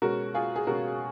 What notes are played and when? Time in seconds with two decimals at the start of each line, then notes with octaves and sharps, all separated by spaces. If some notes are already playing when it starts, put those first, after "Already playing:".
0.02 B2 G#3 C#4 F#4 A#4
0.34 F4 G#4
0.56 G#4
0.67 B2 G#3 C#4 F#4 A#4